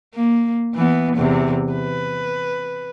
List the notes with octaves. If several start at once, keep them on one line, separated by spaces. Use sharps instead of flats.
A#3
E3 B3
E2 C3
B4